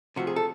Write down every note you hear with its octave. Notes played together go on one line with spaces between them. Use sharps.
C3 F3 A3 F#4
G#4
A4